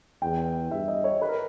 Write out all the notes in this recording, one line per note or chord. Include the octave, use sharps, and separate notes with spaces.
E2 G5
G2 E5
D#5
C#5
B4
A#4